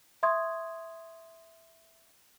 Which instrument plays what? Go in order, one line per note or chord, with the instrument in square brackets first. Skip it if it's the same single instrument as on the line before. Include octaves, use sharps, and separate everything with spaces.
[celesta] E5 C6 C#6 D#6 G#6